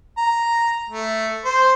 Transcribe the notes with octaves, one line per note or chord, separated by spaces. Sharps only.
A#5
A3
C5